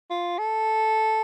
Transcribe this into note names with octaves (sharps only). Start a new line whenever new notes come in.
F4
A4